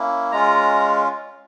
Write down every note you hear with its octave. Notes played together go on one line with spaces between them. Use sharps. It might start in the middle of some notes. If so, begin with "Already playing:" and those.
Already playing: A#3 C#4 E4
G#3 C#4 F4 A#5